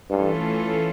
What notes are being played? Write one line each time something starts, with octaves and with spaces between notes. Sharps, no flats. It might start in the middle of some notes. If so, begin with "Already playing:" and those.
G2 E3 A3 C#4 F4 A4